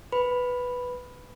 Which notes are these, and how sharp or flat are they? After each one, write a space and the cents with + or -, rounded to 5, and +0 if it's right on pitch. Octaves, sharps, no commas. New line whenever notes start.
B4 +0 B5 +0